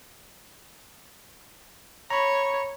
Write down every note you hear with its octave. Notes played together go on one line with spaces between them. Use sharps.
C#5 A#5 B5